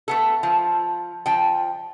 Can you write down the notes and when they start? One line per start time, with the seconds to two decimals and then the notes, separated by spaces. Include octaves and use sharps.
0.08 A3 B3 A4
0.43 F3
1.26 F3 G5